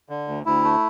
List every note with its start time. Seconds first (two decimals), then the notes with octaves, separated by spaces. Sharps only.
0.09 D3
0.28 D2
0.46 D2 E4
0.64 A3